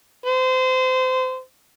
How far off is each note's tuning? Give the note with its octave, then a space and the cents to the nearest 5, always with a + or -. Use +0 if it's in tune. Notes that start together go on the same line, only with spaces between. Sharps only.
C5 -25